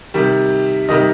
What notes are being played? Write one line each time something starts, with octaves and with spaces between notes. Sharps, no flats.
C3 D#3 G3
C3 D#3 G3 D#5